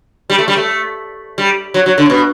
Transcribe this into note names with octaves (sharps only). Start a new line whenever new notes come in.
G3
A3
G3
A3
G3
F#3
F#3
D3
A2
B2